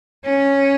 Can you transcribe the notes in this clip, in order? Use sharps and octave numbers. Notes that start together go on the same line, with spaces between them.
C#4